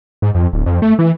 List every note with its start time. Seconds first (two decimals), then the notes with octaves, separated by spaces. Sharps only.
0.22 G#2
0.35 F2
0.53 D1
0.66 F2
0.82 A3
0.99 E3